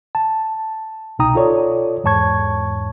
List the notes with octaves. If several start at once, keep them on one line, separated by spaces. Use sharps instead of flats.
A5
C2 B2 D#4 G5 A#5 D#6
F4 A4 C#5 D5
E2 G#2 C#5 A5 C#6 G#6